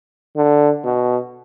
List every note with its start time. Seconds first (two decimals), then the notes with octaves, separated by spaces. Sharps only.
0.36 D3
0.84 B2